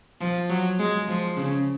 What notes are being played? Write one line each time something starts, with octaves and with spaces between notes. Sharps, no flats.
F3
F#3
G#3
F3
C#3